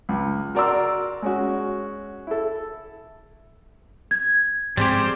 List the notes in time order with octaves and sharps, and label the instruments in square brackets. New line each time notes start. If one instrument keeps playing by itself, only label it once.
[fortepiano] C#2
F#4 A#4 D5 A#5 C6 E6
G#3 C#4 F#4
E4 A4
[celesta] G#6
[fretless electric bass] G#2 F3 C4 [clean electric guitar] G3 G#3 G4 [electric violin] C5